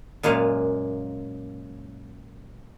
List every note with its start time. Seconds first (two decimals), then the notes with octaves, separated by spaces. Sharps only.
0.23 F#2 A#2 G#3 F5